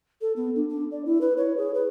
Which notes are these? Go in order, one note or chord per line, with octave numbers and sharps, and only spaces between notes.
A4
B3
D4
D4
D5
E4
B4
C#5
G#4
B4